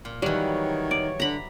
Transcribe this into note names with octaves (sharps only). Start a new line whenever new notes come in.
A#2
D#3 E3 F#3 G3 C#5
D5
D3 A#5 B5